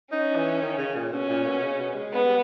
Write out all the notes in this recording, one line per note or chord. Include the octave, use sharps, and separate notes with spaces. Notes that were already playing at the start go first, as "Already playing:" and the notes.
C#4 D#4
E3
D#3
C#3
A#2
B2 C#4
A#2
B2
C#3
B2
G#3
G#3 B3
G3